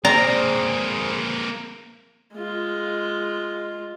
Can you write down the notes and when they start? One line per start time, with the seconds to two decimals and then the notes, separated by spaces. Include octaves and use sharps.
0.05 A#3 C4 G#4 C5 D5 A#5
2.34 G#3 F4